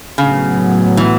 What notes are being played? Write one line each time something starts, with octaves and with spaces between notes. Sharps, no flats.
A2 C#3 F#3 B3
E3